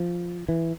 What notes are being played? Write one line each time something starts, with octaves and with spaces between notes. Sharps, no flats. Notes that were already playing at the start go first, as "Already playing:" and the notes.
Already playing: F3
E3